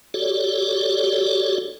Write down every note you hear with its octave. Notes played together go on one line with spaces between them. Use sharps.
F#4 G4 A4 C#5 D5